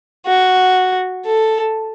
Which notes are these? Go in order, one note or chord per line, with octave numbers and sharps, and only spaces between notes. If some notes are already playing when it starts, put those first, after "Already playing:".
F#4
A4